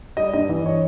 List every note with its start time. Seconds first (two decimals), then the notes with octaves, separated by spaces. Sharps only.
0.17 G3 D#5
0.33 G2 D#5
0.49 E3 D#5
0.66 C#5